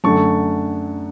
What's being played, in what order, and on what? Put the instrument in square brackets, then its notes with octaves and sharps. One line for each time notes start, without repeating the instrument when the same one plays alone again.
[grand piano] F#2 D3 A3 A5 C#6